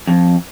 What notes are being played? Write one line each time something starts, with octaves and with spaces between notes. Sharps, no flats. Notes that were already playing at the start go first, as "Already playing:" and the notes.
F2